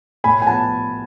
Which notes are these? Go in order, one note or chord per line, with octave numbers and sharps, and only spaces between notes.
A2 G#5 B5
G#5
F3 B3 F#5 A5